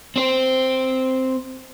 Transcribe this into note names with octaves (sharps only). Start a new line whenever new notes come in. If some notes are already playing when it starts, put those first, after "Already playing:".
C4 C5